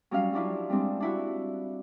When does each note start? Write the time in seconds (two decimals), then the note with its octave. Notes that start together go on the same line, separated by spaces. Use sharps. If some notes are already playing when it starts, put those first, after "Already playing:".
0.11 F#3 G3 C#4 F5
0.33 F3 F#3 D4 E4 F4
0.69 G3 G#3 C4 D4
1.00 D4 E4 F#4